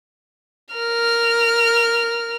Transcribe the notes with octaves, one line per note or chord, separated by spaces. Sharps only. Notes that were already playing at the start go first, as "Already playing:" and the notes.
A#4 F6